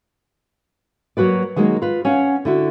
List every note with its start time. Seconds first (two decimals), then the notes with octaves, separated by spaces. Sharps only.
1.17 F#3 A#3 F#4 B4 D5
1.56 D#3 F#3 G#3 A#3
1.82 F4 B4
2.05 C#4 C#5 F5 F#5
2.45 D3 E4 F#4